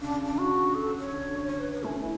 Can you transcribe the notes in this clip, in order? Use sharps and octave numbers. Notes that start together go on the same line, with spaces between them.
C#3 D4
D3
C#3 D4
F#4
A4
C#5
D3
C#5
B4
B4
A3 C#4
E4